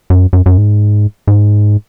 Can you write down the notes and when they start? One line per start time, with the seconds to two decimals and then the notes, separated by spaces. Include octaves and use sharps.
0.10 F#2
0.33 F#2
0.46 F#2
0.57 G#2
1.27 G#2